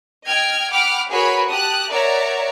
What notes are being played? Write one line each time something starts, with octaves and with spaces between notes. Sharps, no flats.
D#5 G5 F6 G#6
F#5 G5 B5 D6 F6
F#4 G#4 A#4 B4 C#5 B5
G4 A5 D#6 F#6
A#4 C#5 D5 E5 F#5 A#5